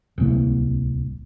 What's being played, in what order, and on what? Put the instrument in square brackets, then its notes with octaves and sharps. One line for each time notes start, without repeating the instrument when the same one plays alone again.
[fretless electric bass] D1 C2 A#3